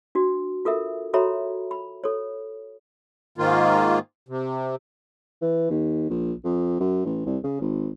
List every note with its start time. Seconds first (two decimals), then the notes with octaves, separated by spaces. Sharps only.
0.15 D4 F#4
0.65 F4 A4 A#4 E5
1.13 F#4 A4 C#5 E5 A#5 B5
1.71 B5
2.04 A4 C#5
3.38 G#2 D#3 A#3 F4
4.29 C3
5.42 E3
5.70 D#2
6.10 A#1
6.44 F2
6.80 F#2
7.06 A1
7.26 C2
7.44 C#3
7.61 G#1